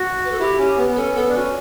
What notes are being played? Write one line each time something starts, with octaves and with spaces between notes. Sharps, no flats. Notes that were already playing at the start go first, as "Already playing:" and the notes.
Already playing: F#4
B4
A4
E4 G4
C#4
B3
B3
C#4 A4
B3 A4
D4
C#4 F#4